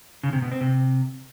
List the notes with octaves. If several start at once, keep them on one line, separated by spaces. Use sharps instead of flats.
C#3
C3
B2
C4
C3